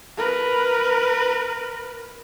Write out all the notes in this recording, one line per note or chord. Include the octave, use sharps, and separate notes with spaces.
A#4 B4